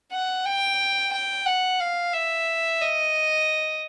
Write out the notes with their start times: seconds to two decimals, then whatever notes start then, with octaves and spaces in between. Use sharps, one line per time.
0.13 F#5
0.46 G5
1.13 G5
1.46 F#5
1.80 F5
2.14 E5
2.81 D#5